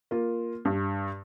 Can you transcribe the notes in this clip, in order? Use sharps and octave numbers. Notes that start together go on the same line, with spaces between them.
A#3 F4
G2